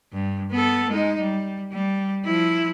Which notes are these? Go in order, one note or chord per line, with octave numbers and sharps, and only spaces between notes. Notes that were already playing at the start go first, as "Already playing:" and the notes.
G2
B3 A4
G#3 D#4
G3
G3
F3 E4